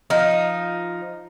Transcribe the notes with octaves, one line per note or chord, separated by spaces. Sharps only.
F3 D#4